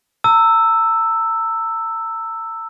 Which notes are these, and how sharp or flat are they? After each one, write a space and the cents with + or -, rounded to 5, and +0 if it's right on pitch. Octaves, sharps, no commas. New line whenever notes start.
A#5 -40 E6 +0